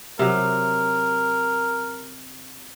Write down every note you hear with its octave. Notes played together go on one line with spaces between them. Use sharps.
C3 F#3 A#4